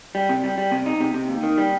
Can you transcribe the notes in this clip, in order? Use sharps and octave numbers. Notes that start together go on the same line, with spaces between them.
G3
C3
G3
G3
C3
D#4
C3
C3
D#2
D#3
G3